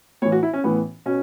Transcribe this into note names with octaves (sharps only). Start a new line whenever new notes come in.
A2 E3 C#5
F#4
E4
C#4
A2 E3 B3
B2 C#4